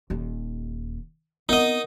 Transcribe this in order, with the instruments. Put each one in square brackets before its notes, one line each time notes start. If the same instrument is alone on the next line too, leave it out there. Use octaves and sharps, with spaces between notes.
[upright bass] D#1 D#2
[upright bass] B3 C4 [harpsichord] D#4 D#5 [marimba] A#4 F#5 D#6